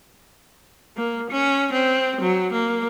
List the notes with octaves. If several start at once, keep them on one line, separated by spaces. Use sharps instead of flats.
A#3
C#4
C4
F#3
A#3